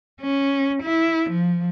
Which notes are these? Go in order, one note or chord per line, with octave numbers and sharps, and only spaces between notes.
C#4
E4
F3